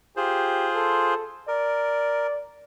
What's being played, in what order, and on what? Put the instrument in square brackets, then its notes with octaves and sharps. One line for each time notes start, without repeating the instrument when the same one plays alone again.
[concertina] F4 G#4 C5 [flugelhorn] G4
[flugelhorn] A4
[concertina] A#4 [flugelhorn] D5